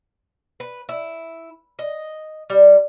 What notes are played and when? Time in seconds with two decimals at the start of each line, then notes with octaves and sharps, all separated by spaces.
0.60 B4
0.89 E4
1.79 D#5
2.50 G3